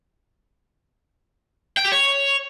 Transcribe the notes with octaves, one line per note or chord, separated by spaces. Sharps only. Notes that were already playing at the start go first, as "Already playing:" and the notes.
G5
G4
C#5